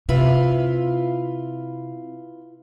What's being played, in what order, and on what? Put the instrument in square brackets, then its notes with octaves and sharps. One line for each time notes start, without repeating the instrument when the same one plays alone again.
[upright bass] C3 [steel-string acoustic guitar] E4 F4 B4